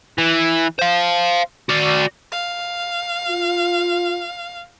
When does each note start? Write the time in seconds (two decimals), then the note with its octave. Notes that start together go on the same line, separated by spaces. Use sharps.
0.18 E3
0.79 C5 F5
1.69 F#4 D5
2.32 F5
3.28 F4